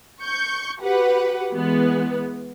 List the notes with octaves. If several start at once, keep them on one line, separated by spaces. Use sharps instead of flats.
C#6 G6
F#4 G4 B4 F#5
E3 G#3 B3